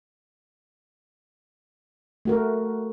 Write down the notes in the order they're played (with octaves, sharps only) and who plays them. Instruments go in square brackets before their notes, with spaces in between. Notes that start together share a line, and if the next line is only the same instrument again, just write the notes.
[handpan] A3 F#4 A#4